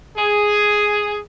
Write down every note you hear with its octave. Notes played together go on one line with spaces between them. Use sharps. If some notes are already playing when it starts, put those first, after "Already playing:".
G#4